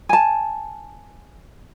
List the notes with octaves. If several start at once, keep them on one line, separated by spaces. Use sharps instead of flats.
G#5 A5